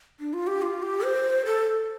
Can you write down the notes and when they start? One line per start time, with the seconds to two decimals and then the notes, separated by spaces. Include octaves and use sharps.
0.20 D4
0.33 F4
0.47 G4
0.62 F4
0.83 G4
1.04 C5
1.45 A4